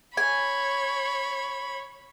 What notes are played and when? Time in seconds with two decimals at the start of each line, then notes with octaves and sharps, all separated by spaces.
0.17 C#5 G#5 B5